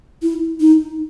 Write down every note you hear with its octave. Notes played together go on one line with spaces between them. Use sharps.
E4
D#4